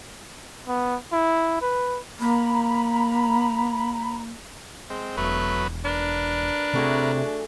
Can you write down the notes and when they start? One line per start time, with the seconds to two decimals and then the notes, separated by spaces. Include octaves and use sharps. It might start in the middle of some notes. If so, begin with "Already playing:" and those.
0.67 B3
1.13 E4
1.62 B4
2.20 A#3 A#5 B5
4.90 G#3 C4
5.17 E1 F#3 A3 B3 B4
5.85 D4 A#4 B4
6.74 C3 A3 F#4 G#4